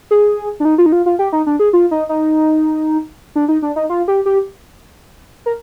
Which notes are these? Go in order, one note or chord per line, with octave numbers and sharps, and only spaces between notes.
G#4
D4
D#4
F4
D#4
F4
F4
G4
D#4
D4
G#4
F4
D#4
D#4
D4
D#4
D4
D#4
F4
G4
G4
A#4